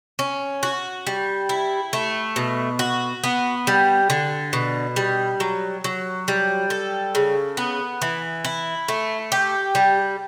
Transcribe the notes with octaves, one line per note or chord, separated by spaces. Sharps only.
C#4
F#4
G3
E4
A3
B2
F#4
B3
G3
D3
B2
G3
F#3
F#3
G3
A4
C#3
B3
E3
E4
A3
G4
G3